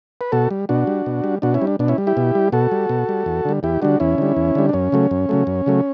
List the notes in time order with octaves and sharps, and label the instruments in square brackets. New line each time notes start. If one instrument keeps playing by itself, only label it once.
[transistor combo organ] B4
B2 F#4 A4
G3
B2 D4 F#4
G3
B2
G3
B2 D4 F#4
C#4 E4
G3
D4
B2 D4
C#4 E4
G3
E4 G4
B2
G3
B2 F#4 A4
G3
B2
G3
E2
D3 G3
E2 E4 G4
D3 G3 D4 F#4
E2 C#4 E4
D3 G3
E2
D3 G3
D4
F#2 C#4
C#3 F#3 A3
F#2
C#3 F#3 A3
F#2
C#3 F#3 A3